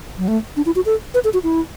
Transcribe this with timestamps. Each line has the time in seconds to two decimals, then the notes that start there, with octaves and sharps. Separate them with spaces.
0.18 F#3
0.28 A3
0.57 D4
0.66 E4
0.76 F#4
0.86 A4
1.14 B4
1.24 A4
1.34 F#4
1.43 E4